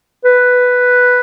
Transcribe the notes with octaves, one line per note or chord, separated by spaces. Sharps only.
B4